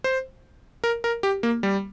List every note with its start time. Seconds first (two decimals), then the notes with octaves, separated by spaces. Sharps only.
0.04 C5
0.84 A#4
1.04 A#4
1.23 G4
1.43 A#3
1.63 G3